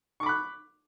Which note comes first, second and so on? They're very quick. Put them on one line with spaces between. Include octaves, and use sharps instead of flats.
C#6 D6 B5 F#6